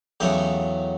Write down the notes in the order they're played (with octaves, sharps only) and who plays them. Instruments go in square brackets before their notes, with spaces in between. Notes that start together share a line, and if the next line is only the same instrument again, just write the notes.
[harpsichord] E2 C#3 F#3 A3 G4